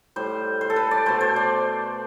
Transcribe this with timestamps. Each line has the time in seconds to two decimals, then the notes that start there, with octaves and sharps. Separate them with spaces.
0.16 A2 G3 C5
0.61 C5
0.70 A4
0.76 B4
0.91 D5
1.06 B2 A3 C5
1.21 C5
1.36 D5